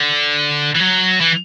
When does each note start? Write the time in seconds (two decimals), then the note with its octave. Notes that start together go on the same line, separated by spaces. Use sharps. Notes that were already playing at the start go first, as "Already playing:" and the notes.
Already playing: D3
0.75 E3
0.80 F#3
1.21 E3